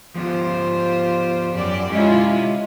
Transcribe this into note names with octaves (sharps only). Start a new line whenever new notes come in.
F3 B3 F4 G4 C5
F#2 G4 D5
G#3 C#4 E4 F4 G4 E5